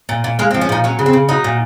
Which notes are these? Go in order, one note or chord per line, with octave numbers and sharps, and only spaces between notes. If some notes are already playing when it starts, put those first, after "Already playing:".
A#2
A#2
G#3 A#3
C4
F3
C#4
A#2 D#4
F#3 C#4
C#3
C4
C#3
F#3 D#4
A#2